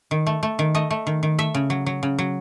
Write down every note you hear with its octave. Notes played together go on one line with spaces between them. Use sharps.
D#3
A3
A3
D#3
A3 D#5
A3
D#3
D#3
A3 E5
C#3
F#3
F#3
C#3
F#3